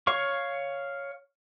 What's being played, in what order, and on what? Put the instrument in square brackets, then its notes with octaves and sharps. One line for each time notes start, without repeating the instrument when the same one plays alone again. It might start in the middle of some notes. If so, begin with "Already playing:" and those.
[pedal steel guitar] C#5 F5 C#6